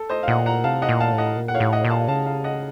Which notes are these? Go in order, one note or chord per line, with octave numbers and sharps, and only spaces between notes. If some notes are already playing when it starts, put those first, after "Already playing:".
Already playing: A4
C5 D#5
F5
A#2 D#5 F#5
F#5 A#5
C3 F5 A5
D#5 F#5
A#2
F5 A5
A2
D#5 F#5
A#2
F#5
C#5 F5
A2
D#5 F#5
A#2
F5 A5
C#3 F5 A5
F5 A5
D#5 F#5